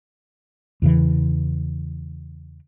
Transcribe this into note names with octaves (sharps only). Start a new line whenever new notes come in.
E2 C#3 E3